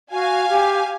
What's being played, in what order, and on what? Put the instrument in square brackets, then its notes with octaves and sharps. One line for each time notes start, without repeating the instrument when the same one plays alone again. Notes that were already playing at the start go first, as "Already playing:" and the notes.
[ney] F#4 [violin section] F5 G#5
[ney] G4